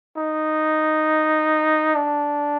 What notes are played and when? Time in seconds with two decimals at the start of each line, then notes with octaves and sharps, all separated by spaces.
0.17 D#4
1.95 D4